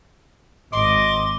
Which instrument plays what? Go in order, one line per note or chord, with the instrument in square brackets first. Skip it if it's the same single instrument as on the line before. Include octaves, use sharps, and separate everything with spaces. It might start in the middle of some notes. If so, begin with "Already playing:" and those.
[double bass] G#1 [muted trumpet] D#5 [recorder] C6 [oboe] D6